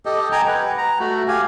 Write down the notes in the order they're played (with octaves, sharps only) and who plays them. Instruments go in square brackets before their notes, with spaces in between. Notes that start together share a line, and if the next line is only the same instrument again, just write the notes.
[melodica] G4 A4 D#5
G5 G#5 A#5
B4 F#5
A#5
A3 F#4
G4 F5 G#5